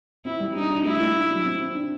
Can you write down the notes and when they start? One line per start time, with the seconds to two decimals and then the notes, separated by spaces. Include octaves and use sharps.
0.25 C4 E4
0.40 G3
0.55 D4 D#4
0.70 D4
0.85 A3 E4
1.00 A3
1.15 D4
1.30 F#3
1.45 C4
1.60 C4
1.75 D4